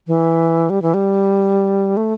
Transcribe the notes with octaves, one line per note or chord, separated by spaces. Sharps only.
E3
G3
E3
G3
A3